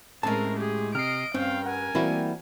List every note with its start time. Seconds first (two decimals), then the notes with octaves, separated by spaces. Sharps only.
0.23 A2 G#3 C4 C#4 A#4 A5
0.57 G4 G#4
0.95 C3 D#5 F6 C7 D7
1.34 G2 C4 C#4 F5 G5
1.66 A#4 F#5 G#5
1.95 E3 G3 A#3 C4 E4 F#4